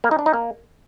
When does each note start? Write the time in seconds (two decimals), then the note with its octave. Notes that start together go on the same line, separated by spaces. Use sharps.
0.04 A#3
0.11 D#4
0.19 D4
0.26 D#4
0.33 A#3